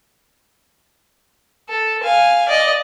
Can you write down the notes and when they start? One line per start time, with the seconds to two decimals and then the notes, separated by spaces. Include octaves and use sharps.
1.69 A4
2.04 F5 G#5
2.49 D5 D#5